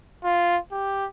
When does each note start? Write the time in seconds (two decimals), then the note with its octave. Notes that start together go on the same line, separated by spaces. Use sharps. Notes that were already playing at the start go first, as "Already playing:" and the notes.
0.24 F4
0.72 G4